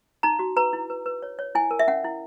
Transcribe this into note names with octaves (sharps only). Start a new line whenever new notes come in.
D#4 A#5
F#4
B4 A#5
E4
B4
B4
C#5
C#5
E4 G#5
A#4
E5
C#4 F#5
E4